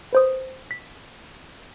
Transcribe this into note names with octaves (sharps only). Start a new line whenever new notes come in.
B4 C5 D#6
B6